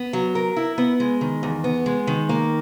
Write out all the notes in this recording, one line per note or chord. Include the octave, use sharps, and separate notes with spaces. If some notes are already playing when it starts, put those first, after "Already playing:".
Already playing: B3
F#3
A#4
E4
B3
G#3
D#3
E2
B3
G#3
D#3
A#3